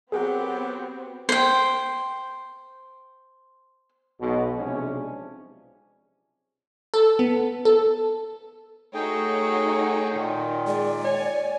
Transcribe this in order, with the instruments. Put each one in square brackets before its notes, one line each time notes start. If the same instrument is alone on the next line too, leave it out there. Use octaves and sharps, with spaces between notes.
[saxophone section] F#3 G4 [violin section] B3 C4 [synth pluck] G#4 A#4 F#5
[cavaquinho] C5 G5
[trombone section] B1 B2
B1 C3 F3 G#3 C#4 D4
[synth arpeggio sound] A4
B3
A4
[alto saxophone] A3 [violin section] D#4 F#4 C#5 [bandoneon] G#4 G5
[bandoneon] A#2 D#3
[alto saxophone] G#3 [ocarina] D5
[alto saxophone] C#5 [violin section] G#5